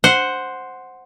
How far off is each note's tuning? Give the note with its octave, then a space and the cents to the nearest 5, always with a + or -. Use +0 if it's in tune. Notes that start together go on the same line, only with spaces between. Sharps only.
C5 +0 F#5 +0